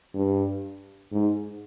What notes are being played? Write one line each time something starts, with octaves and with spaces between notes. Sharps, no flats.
G2
G#2